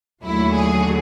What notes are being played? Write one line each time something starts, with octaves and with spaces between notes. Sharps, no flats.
D#2 D3 F#3 A3 E4
G#4